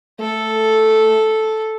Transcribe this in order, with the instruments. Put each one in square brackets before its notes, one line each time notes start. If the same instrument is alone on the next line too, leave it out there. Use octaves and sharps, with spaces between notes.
[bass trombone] A3 [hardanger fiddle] A4